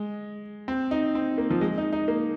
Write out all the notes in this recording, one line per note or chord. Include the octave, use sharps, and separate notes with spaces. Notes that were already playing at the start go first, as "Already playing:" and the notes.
Already playing: G#3
C4
D#4
C4
A#3
F3
G#3
D#4
D#4
A#3